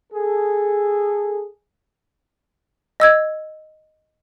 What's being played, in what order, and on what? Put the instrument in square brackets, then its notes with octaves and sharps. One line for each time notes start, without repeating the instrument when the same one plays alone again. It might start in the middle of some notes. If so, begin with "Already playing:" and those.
[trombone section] G#4 A4
[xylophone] D#5 E6 G#6